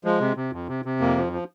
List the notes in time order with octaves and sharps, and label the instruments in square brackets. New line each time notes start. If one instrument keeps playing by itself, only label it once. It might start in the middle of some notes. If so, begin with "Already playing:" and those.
[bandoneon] F3 G#3
C3
C3
F2
C3
C3
F2 A#3
F3
F3